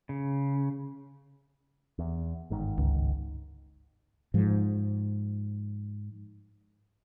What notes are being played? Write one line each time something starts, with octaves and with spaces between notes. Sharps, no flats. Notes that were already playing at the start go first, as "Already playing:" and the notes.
C#3
E2
G1 G#2 D#3
C#2
G#2 F3